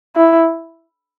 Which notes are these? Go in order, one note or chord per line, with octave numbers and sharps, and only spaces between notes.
E4